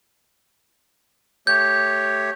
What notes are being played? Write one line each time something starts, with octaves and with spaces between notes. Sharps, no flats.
A3 G4 C#5 G6